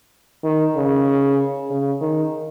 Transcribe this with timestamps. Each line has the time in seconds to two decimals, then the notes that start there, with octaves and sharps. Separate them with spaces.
0.44 D#3
0.75 C#3
1.70 C#3
2.01 D#3